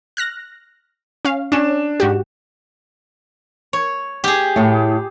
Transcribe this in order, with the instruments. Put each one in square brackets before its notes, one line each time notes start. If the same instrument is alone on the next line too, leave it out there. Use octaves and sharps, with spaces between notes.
[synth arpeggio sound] F6 F#6 A#6
C#4 F5
[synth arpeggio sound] C#4 [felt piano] D4 E7
[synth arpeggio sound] G#2 F#4 G4
[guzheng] C#5
G4 G#4
[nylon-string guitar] A2 A3